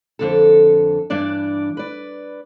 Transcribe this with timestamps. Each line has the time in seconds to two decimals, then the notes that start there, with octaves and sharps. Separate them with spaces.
0.19 F2 D3 A4
1.10 G2 E3 D4 D5
1.77 B4 D5